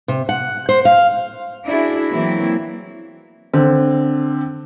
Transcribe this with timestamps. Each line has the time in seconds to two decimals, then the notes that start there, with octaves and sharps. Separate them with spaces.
0.08 C3
0.29 F#5
0.69 C5
0.85 F5
1.66 D4 E4 F#4 G#4
2.10 E3 F#3 A#3 C4 E4
3.53 D3 C4